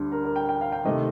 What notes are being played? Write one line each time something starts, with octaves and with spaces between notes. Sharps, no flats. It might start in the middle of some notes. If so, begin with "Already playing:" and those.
Already playing: D2 D3 G3 D4
A#4
A#4
G5
G5
F5
G5
C3 D#3 A3 D#5